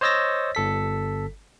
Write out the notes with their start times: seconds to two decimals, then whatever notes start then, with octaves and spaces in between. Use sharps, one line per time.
0.01 C5 C#5 D#5 E6 A6 A#6
0.55 G1 A4 B6